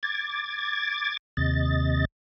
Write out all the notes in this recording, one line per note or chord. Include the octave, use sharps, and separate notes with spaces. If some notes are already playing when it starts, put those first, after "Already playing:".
D6 G#6 A6
D#2 C3 D#5 A6